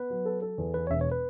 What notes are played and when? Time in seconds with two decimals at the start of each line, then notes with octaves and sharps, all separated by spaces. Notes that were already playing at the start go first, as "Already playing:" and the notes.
Already playing: B3 B4
0.10 F#3
0.25 A4
0.41 A4
0.58 E2
0.74 E2 B4
0.87 C#5
0.90 E1 E5
1.01 C#5
1.12 B4